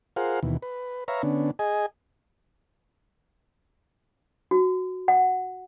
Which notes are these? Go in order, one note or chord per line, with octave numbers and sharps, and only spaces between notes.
F4 G#4 A#4 C5 F5 F#5
D#2 B2 E3
B4
B4 C#5 E5 F5 A#5
D3 B3 C#4 D4
G#4 D#5 G#5
F#4
F#5